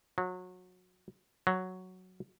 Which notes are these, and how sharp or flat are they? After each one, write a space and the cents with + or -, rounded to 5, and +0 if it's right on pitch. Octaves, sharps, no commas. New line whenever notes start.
F#3 -25
F#3 +0